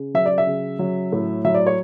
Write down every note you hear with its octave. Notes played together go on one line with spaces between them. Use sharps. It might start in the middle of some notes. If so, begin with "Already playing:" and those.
Already playing: C#3
F#3 E5
D5
E5
C#3
F#3
A2
F#3 E5
D5
C#5